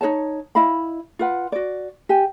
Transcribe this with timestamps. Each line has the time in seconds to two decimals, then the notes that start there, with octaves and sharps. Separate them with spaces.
0.01 D#4 C5 C#5 A5
0.55 E4 D#5 F5 B5
1.19 F4 B4 F#5
1.52 F#4 D5
2.09 G4 G#5